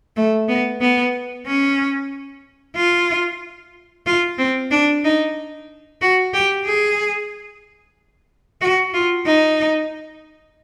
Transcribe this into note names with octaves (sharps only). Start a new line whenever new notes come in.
A3
B3
B3
C#4
F4
F4
C4
D4
D#4
F#4
G4
G#4
F#4
F4
D#4